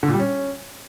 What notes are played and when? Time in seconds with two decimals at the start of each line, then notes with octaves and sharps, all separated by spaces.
0.03 D3
0.08 A#2
0.14 G3
0.19 C#4